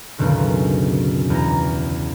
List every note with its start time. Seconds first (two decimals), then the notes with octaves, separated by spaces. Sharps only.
0.18 C#2 F#2 B2 D3 D#3
1.30 E2 A#5